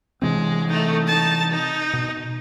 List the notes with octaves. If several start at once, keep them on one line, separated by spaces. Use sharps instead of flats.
C3 E3 G#3 C4
A3 D#4
D#4 A5
D#4
B2